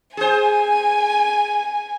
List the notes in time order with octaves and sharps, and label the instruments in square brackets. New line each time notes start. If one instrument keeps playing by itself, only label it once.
[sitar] G#4 C5 [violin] G#5